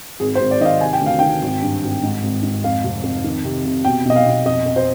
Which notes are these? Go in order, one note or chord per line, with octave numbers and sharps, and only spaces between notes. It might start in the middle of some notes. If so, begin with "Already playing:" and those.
G#1 G#4
C5
G#1
D5
D#3 D#5 F5
C3 G#5
G5
D2
F5
D#3 G5
G#1
G2
G#1
G#2
G#1
G#2
F2 F5
F1
F2
D#3
C3
C3
B2 G5
B1 D#5
F5
B1
F2 D#5
F2
C5